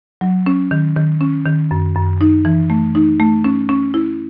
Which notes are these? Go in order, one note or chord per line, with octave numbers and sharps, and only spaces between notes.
F#3
C#4
D#3
D#3
C#4
D#3
F#2
F#2
D#4
E3
A3
D#4
A3
C#4
C#4
E4